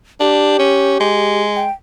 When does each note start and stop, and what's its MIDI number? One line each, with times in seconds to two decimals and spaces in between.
0.20 0.57 62
0.20 1.41 67
0.59 0.96 61
1.00 1.66 56
1.56 1.71 79